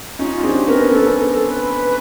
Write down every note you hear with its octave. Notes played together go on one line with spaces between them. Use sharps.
C#4 D#4 F4
F4
C4 D4 G#4
G4
B3 C#4 A#4
B3 C#4 A4
A#4
A4
A4
B4